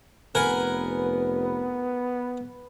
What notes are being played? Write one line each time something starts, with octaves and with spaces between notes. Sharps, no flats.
F1 B3 A#4 B4 F#5 G#5